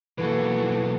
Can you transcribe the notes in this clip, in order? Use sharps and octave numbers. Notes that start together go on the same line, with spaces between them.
B1 E3 A#3 F#4 A4 B4